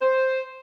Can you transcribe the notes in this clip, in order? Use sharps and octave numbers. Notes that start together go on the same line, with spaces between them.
C5